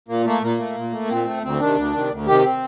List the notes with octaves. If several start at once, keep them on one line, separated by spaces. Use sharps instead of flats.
A#2 A#3
A3 A#3
A#2 A#3
A3
A#2
A3
A#2 C4
A3
D2 C4
C3 D#3 D4
D2
C3 D#3
D2
C3 D#3 G4
C4